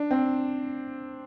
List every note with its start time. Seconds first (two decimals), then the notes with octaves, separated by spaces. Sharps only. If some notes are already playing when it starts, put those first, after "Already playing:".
Already playing: D4
0.11 C4